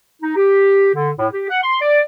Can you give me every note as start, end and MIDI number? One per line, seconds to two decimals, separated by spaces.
0.22 0.34 63
0.36 0.90 67
0.94 1.11 50
1.19 1.27 45
1.32 1.48 67
1.50 1.61 78
1.63 1.78 84
1.81 2.02 74